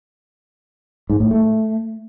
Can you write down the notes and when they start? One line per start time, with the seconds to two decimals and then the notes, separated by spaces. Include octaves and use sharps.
1.10 G#2
1.20 A2
1.31 A3